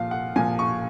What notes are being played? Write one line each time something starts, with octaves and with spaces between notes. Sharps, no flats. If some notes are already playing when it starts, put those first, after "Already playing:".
Already playing: A#2 F3 F5
F#5
A#2 F3 G#5
C#6